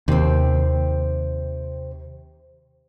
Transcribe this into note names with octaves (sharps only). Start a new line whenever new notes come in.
D#2 C3 C4